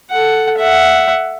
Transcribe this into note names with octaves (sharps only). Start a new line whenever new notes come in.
A4 F#5
E5 F#5